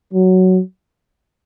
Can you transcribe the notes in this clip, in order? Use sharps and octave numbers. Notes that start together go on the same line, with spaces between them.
F#3